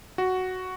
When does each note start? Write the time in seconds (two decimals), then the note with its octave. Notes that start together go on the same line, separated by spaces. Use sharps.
0.18 F#4